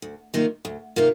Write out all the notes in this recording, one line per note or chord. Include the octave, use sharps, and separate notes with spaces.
D2
C3 D#3 A#3 F4
D2
C3 D#3 A#3 F4